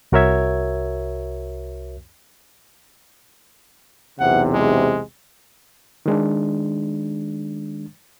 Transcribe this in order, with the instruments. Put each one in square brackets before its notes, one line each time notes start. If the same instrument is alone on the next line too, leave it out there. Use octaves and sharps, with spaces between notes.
[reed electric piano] C2 F#4 A#4 C#5 E5 G#6
[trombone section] B1 E2 C3 [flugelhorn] F#5
[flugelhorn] G#3
[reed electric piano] D#3 G#3 D4